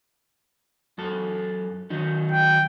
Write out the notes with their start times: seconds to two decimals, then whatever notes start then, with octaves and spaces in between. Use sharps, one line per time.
0.98 F#2 A4
1.90 D#3 F#3 D#4
2.31 G5